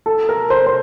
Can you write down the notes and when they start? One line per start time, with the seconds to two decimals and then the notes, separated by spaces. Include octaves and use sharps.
0.06 A4
0.29 A#4
0.50 C5
0.66 C5